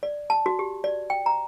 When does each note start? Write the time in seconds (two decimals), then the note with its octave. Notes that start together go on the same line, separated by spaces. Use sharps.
0.03 D5
0.30 A5
0.46 F#4
0.59 G4
0.84 D5
1.10 G5
1.26 A#5